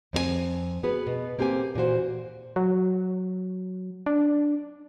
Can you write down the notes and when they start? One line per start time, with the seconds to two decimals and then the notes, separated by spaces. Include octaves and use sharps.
0.13 F2 C4 G4 G#5
0.83 B3 F#4 G#4 B4
1.07 B2
1.39 A#3 C4 G4 A4 G#5
1.75 A#2 E3 F#4 C5
2.56 F#3
4.06 D4